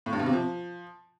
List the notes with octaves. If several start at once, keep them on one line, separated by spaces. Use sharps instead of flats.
A2
G2
B2
C3
F3